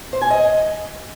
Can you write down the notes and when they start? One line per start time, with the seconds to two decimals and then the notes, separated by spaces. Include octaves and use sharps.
0.13 C5
0.21 G#5
0.30 D#5